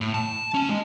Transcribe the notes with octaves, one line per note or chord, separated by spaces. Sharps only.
A2
A5
C#4
G#3